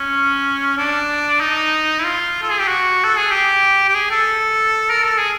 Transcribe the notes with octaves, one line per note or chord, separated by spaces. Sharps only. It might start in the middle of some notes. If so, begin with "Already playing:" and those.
Already playing: C#4
D4
D#4
E4
F4
A4
G#4
G4
F#4
A4
G#4
G4
G4
G#4
A4
A#4
A4
G#4